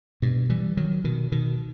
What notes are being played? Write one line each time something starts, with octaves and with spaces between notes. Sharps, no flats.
G2 B2
E3 G3
D#3 F#3
B2 D#3
B2 D#3